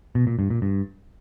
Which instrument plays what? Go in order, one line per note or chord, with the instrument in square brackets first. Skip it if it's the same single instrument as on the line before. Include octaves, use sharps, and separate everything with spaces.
[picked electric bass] B2
A#2
G2
A#2
G2